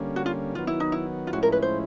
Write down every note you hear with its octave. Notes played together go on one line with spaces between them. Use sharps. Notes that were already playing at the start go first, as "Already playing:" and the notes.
Already playing: D3 G3 A#3 C#4
F#4
F4
D#3 F#3 B3 F4
E4
D#4
E4
F4
A2 F3 G#3 C#4 E4 F#4
A#4
B4
C5